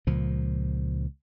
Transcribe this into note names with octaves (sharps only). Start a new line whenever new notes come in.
C#2 A#2 F3